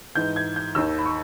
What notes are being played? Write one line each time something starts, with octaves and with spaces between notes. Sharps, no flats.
G#2 E3 G6
G#6
G6
D#2 D#3 E6
B5
C#6